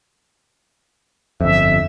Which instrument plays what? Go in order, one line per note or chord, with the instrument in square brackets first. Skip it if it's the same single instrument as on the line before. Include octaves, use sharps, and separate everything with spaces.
[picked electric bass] G1 F2 [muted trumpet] E5